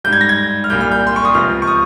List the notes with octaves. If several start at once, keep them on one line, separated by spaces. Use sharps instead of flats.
G#2 G3 G6
G#6
A#6
G#6
F6
C2 A#2 G3 G6
F6
G6
C6
C#6
D#6
C#2 C3 F3 F6
C#6
D#6